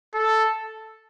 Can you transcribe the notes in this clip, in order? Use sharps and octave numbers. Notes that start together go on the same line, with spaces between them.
A4